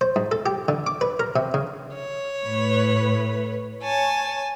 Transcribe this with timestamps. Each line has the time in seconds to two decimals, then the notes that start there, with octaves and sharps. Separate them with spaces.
0.01 C5
0.16 G#2
0.31 A4
0.46 G4
0.68 D3
0.87 D6
1.01 B4
1.20 A#4
1.36 C3
1.54 C#3
1.94 C#5
2.46 A2 B4
3.83 C#5 G#5 A5